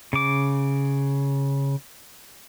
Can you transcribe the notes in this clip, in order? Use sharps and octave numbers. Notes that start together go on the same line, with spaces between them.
C#3 D6